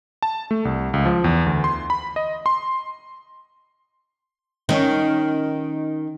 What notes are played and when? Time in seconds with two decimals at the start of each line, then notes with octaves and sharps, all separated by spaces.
0.22 A5
0.51 A3
0.65 C2
0.94 C#2
1.05 F3
1.24 E2
1.46 D2
1.64 C6
1.90 B5
2.16 D#5
2.46 C6
4.69 D#3 C#4